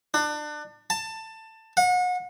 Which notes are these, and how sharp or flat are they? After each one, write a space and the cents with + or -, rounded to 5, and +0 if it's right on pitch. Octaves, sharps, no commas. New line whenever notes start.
D4 +30
A5 +15
F#5 -35